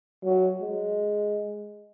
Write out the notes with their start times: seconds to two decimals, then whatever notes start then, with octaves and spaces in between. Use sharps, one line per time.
0.24 F#3
0.61 G#3